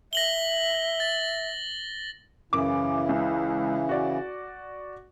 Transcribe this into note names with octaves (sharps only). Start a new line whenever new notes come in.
E5 A#6 F#7 G7
A6
F#2 C#3 E3 E4 D6
C#2
F#4 D5